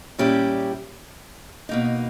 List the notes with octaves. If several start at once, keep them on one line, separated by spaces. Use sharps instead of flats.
A#2 G3 C#4 E4 G4
B2 A#3 D#4